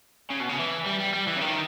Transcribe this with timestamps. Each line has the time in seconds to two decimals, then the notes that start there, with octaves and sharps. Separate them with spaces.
0.31 C#3
0.40 B2
0.49 C#3
0.59 E3
0.86 G3
1.00 G3
1.14 G3
1.27 E3
1.36 C#3
1.41 D#3